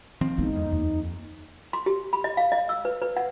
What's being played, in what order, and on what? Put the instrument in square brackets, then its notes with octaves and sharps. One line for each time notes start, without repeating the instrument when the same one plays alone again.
[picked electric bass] D#3 F3 C4
[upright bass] E2 G#3 [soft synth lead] D#4
[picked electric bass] F2
[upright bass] D#2
[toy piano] C6
G4
B5
D#5
F5
D#5
E6
B4
B4
F#5